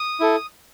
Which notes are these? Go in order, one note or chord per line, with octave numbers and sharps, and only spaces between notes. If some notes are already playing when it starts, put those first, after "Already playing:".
Already playing: D#6
E4 A4